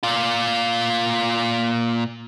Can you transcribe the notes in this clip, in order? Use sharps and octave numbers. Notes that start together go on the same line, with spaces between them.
A#2 F4